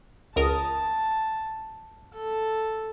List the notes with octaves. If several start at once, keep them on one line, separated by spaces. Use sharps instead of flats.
C#2 A#4 A5 D#6
A4